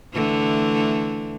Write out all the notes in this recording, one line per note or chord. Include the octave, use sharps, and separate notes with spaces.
D3 E3 A3